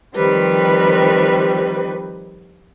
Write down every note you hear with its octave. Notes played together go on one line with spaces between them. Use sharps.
D#3 F3 G3 C4 B4